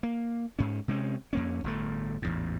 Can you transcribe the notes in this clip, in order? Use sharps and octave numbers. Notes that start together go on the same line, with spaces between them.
A#3
G#2 C#4
C3 G#3 C4 C#4
F2 A#3 C#4
G1 A2 A3
A1 E2 G#2